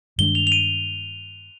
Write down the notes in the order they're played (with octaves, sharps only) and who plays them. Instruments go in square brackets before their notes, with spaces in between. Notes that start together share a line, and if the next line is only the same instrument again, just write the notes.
[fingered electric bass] G2 D#3 G#3 D4 [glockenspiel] G7
[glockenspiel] F7
F7
D#7